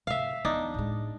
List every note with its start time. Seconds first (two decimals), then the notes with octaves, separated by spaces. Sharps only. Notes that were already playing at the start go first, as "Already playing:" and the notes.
0.07 G#2 C3 E5 F5
0.45 E2 D4 D#4
0.74 A2 G#3